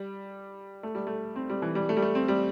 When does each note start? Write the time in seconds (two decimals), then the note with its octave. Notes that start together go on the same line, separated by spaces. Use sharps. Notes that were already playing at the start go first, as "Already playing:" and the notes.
Already playing: G3
0.83 A3
0.95 G3
1.07 A3
1.36 C4
1.50 G3
1.62 E3
1.75 G3
1.89 A3
1.97 G3
2.02 A3
2.15 C4
2.28 G3